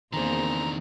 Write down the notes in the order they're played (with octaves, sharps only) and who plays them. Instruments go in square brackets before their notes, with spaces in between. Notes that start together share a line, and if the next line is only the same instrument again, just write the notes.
[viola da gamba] E2 A#3 C4 [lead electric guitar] D#3 D4 [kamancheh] G#4 C5 [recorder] A#5